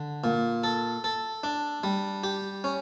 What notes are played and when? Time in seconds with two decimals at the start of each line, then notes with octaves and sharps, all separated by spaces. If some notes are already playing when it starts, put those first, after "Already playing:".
Already playing: D3
0.24 A#2
0.64 A4
1.04 A4
1.44 D4
1.84 G3
2.24 G4
2.64 C#4